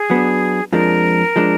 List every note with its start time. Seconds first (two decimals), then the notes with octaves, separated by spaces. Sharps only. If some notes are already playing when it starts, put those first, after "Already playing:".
Already playing: G#4
0.10 F#3 B3 D4
0.72 F2 F3 G#3 D4 A#4
1.36 F3 G#3 D4